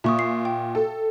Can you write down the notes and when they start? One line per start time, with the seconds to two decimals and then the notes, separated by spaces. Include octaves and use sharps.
0.04 A#2 E5 C#6 D#6
0.19 C7
0.45 G5
0.75 A4